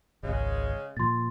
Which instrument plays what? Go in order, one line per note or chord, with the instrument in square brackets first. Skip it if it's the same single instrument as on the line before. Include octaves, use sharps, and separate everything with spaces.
[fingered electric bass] G#1 C#2 [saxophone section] C#3 G#3
[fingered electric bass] A#2 F3 [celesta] C6 A6